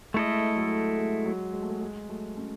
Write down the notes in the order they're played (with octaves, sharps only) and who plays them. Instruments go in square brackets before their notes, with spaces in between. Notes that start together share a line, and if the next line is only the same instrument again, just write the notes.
[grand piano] G#3 [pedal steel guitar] A3 E4 A4 D#5
[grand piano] F#3
G#3
F#3
G#3
A3
G#3
G#3
F#3 A3
A3 C#4